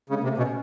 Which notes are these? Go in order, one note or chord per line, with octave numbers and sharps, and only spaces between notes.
C#3 G#3
A#3
C3
A3
B2 C#4